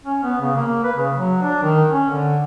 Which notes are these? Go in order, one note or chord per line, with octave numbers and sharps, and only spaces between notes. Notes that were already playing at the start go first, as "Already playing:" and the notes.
C#4
B3
C#3
A#3
B4
C#3
F#3
D4
D#3
C#4
D3